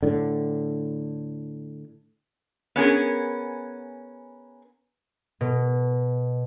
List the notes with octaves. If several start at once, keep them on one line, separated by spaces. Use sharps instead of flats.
A2 D3
B3 C#4 G#4 A#4
B2